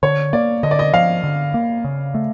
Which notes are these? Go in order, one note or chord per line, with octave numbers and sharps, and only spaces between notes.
D3 C#5
A#3 D5
D3 D#5
D5
D#5
F3 F5
D3
A#3
C#3
A3